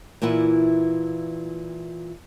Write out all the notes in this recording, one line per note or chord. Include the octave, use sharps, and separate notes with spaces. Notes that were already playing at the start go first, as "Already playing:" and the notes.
A#2 E3 E4 F4 F#5